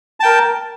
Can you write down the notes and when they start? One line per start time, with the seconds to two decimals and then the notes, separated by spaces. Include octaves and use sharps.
0.20 A5
0.23 G5
0.25 A#4